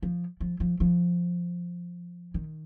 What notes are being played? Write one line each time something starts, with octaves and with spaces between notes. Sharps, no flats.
F3
F3
F3
F3
D#3